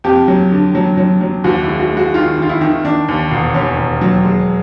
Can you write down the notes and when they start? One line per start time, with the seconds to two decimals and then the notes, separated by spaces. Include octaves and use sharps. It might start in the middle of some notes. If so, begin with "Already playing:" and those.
0.04 F2 G4
0.28 F#3
0.51 D3
0.75 F#3
0.97 F#3
1.21 F#3
1.44 D#2 F#4
1.62 E4
1.68 G#3
1.79 F#4
1.92 G#3
1.97 F#4
2.14 D#3 F4
2.38 D#3 F4
2.49 E4
2.61 D#3
2.85 D#3 D4
3.08 D#2
3.31 E1
3.54 D#2 C#4
3.78 E1
4.01 F#3
4.25 G#3